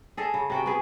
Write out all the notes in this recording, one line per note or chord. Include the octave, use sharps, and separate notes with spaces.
G#4 A4 D#5
C#3
C3 F#4 G5
B3 G#4